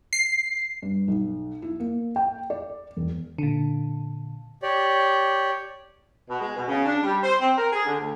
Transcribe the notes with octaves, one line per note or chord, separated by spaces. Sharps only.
C7
G2
B1
E4
A#3
G5
D5
E1
A#2 D3
G4 C#5 D5
B2
G#3
B2
C#3
D4
G3
C5
C4
A#4
G#4
D3
D2